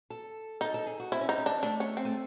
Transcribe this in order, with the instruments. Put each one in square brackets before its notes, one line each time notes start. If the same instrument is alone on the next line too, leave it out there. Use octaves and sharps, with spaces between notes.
[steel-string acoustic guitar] A4
[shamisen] D#4 [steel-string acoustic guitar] A4
[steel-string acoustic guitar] A4
G#4
F#4
[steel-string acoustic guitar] C4 [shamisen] E4
[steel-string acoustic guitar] C#4
[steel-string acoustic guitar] C4 [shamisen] D#4
[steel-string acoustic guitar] C#4
[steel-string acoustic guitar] C4 [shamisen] D4
[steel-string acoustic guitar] A3 [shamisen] D4
[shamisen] C#4
C4
[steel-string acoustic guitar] A3